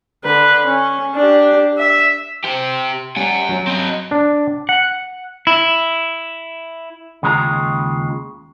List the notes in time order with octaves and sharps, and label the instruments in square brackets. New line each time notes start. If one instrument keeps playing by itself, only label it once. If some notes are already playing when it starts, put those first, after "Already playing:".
[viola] D3 B4
C#4
D4 G4
E5
[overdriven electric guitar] G4 C5
[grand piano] G3 C#4 [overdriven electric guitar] F#5 G#5
[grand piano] F#3
[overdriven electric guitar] C4 D#5
[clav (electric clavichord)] D4
[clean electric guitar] F#5
E4
D#2 C#3 G#3 E4 F4 A#5